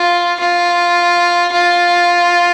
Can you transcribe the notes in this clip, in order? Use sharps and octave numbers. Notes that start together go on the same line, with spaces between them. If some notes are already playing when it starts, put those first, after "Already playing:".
Already playing: F4
F4
F4